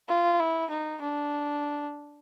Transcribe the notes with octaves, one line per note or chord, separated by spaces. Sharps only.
F4
E4
D#4
D4